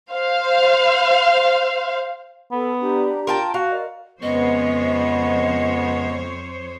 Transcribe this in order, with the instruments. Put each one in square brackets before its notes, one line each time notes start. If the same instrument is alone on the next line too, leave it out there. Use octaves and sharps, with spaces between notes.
[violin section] C5 F5
[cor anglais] B3 [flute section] A4
[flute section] D4 G4 A#5
[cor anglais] F4 [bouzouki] A#4 G5 A5
[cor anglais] F#4 [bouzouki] F5
[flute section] A#4 D5 D#5
[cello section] F2 C5 C#5 [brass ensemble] C#3 G#3 B3 [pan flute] D#5